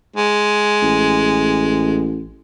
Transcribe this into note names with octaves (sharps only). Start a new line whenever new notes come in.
G#3
A1